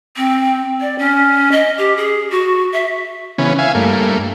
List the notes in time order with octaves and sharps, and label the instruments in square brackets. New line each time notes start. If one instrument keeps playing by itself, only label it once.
[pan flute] C4
D5
C#4
D#5
G4
G#4
F#4
E5
[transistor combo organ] C#3 E3 B3 C#4
E5 F5 G#5
G2 A3 A#3